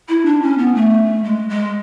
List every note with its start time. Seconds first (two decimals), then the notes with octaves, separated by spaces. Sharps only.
0.09 E4
0.26 D4
0.42 C#4
0.58 B3
0.75 A3
1.24 G#3
1.49 G#3